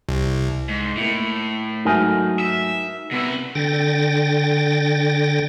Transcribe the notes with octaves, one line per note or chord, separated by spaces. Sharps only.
C2
G#2
A2 A#3 E4
G#2 F#3 A3 D#4 A#4 G#5
E5
C3 B3 E4 E6
D3 G5 A6 A#6